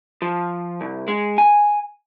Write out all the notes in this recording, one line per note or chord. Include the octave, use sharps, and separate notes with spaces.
F3
C2
G#3
G#5